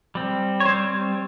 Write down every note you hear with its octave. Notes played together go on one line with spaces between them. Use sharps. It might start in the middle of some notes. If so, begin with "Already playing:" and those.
G3 C4
C#5
G3 C4 C5